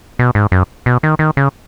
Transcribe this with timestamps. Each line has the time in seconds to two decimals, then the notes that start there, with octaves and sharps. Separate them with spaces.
0.19 B2
0.35 G#2
0.52 F#2
0.86 B2
1.03 D#3
1.19 D#3
1.37 C#3